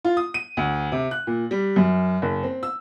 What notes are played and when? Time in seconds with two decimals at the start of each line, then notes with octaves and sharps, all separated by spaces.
0.05 F4
0.17 D#6
0.34 D#7
0.57 D2
0.92 C3
1.11 F#6
1.27 A#2
1.51 G3
1.76 F#2
2.22 F#1
2.43 C4
2.63 E6